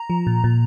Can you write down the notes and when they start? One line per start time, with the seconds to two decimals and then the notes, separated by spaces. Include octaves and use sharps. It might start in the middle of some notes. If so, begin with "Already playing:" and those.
Already playing: A#5
0.10 F3
0.27 A#2
0.44 A#2